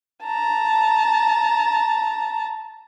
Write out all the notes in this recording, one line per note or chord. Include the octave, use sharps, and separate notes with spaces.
A5 A#5